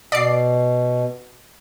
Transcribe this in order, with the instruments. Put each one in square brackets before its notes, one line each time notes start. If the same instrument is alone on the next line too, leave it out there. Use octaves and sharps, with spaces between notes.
[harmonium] B2 [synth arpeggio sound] D5 C7